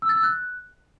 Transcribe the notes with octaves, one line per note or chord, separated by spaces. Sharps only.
E6
A6
E6
F#6